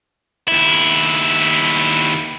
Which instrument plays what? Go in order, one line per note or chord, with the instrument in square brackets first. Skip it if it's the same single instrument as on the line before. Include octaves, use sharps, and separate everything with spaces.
[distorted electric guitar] D#2 E4